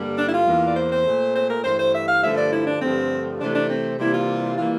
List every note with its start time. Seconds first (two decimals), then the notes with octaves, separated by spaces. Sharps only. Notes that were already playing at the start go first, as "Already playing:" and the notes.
Already playing: G2 D3 G3 A#3
0.18 D4
0.28 E4
0.32 F4
0.47 E2 E3 A#3
0.66 D5
0.76 C5
0.91 C5
1.06 A#2 A3
1.36 C5
1.50 A#4
1.64 G2 E3 A3 C5
1.79 C5
1.94 E5
2.08 F5
2.23 G2 D3 F3 A3 E5
2.38 D5
2.52 E4
2.67 D4
2.82 G2 D3 F3 A3 C4
3.40 C3 E3 A3 D4
3.55 D4
3.70 C4
3.99 C3 E3 G3 A#3 E4
4.13 F4
4.58 E3 G3 A#3 F4